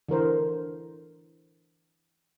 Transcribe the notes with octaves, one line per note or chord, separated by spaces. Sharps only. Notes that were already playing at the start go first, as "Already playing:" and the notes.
D3 E3 A#4 C5